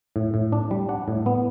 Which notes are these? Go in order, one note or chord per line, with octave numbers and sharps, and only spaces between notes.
A2
A2
D4
G3
D4 F#5
A2
B3